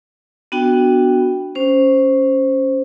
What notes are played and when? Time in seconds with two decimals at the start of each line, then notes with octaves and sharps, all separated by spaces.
0.52 B3 D4 F#4 G5
1.55 C#4 C5